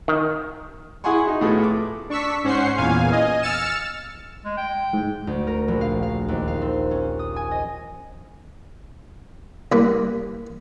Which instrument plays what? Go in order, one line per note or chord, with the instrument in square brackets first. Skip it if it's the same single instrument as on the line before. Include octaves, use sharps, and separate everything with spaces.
[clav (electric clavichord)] D#3
[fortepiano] E4 G#4 F#5 G#5 C6 C#6
D#4 F#4
A2 F3 B3 G#4 A4
D6
[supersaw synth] D4 C#6 E6 B6
G#2 C#4 C5 F#5 C#6 C7
E2 A#2 F5 G#5
D#5 G#5
E6 F6 A6 C#7 E7
[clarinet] G#3
G5
[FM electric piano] G#2
[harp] D2
A#4
A#1
F5
F5
D#2
F5
C4
C#4
D#6
G#5
D#5
[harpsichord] C2 A#3 B4